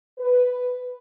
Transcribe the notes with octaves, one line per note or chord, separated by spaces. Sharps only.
B4